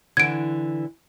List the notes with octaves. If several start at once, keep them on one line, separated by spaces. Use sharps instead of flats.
D3 E3 G#6 D7